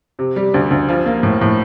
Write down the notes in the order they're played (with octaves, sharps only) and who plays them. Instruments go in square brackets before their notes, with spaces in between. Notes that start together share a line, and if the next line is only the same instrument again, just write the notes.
[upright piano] C3
G3
D2
D2
F3
A#3
A2
A2